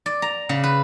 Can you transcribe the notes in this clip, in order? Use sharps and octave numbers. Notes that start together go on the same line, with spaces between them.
D5
A#5
C#3
B4